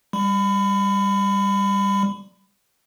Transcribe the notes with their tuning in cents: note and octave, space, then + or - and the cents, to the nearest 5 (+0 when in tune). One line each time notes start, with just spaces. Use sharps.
G3 +10 B5 +30